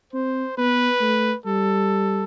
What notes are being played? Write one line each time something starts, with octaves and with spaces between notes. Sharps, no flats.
C4 C5
B3 B4
A3
G3 A4